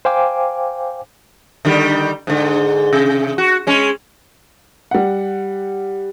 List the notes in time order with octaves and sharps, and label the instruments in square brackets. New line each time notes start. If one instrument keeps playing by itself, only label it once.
[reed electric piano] C5 F5 G5 G#5 D6
[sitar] D3 D#3 G3
G#2 D3
C3
F#4
G#3 C#4
[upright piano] G3 F#5